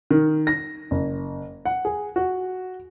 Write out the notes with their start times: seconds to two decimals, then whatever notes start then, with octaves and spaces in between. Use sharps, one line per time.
0.11 D#3
0.47 A#6
0.91 F#1
1.65 F#5
1.85 G#4
2.16 F#4